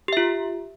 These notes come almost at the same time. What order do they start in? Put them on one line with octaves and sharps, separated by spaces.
G4 E5 F4